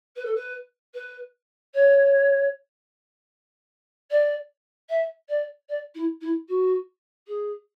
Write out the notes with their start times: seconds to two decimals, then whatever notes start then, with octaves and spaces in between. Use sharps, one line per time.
0.16 B4
0.25 A4
0.35 B4
0.94 B4
1.74 C#5
4.10 D5
4.89 E5
5.29 D5
5.69 D5
5.95 E4
6.21 E4
6.48 F#4
7.27 G#4